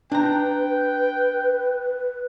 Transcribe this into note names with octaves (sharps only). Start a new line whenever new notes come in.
D4 B4 G5 A#5